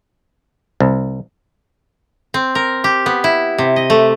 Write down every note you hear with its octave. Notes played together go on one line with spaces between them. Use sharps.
C2
C4
A#4
G4
B3
E4
C3
D#5
A3